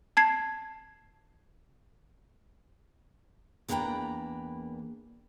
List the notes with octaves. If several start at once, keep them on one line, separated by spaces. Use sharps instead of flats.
A5 G#6 C7
E2 A#3 D4 B4 G5 A#5